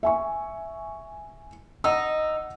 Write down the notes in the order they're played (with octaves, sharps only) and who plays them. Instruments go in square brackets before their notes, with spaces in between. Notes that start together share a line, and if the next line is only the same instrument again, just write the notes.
[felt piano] E5 G#5 C#6
[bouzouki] D#4 [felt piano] F#5 E6